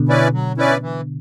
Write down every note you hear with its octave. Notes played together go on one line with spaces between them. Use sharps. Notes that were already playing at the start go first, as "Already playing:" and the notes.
Already playing: B2 D3
C#4 E4 B4 D5
F#3
C#4 E4 B4 D5
E3